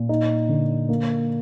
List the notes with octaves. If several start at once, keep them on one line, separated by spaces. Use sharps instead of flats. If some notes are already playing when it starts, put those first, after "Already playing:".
Already playing: A#2
D#4
D3
A#3